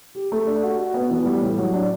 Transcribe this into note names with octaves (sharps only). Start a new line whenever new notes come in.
G4
A3
D4
F#4
F#4
B3
E3
G3
A2
F#3
D4